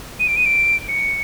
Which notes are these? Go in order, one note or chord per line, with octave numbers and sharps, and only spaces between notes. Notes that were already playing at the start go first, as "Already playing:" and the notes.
D#7
D7
D#7
D7
C#7